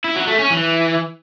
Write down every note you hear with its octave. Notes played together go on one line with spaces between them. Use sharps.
E4
F#3
A3
C#4
E3